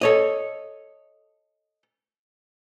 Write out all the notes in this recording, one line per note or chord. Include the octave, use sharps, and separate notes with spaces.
A4 C#5 D#5